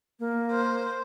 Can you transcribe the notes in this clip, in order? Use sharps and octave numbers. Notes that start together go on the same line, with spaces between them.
A#3
C5